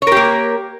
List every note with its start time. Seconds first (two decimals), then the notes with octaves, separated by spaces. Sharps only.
0.02 C#5
0.07 A#4
0.12 G4
0.17 A#3